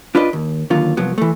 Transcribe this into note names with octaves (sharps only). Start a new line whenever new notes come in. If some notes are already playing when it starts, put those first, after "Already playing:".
D4 F4 B4 D5 D#5
D#2
D#2 D3 F#3 F4
C2 F3 F#3 B3
E3 A3